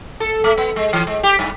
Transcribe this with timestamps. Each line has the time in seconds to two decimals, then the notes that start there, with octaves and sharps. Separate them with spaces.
0.20 A4
0.44 A3
0.57 B3
0.76 G#3
0.93 E3
1.07 G#3
1.23 G4
1.39 G2